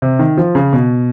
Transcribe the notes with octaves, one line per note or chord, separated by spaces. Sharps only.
C3
D#3
F3
C#3
B2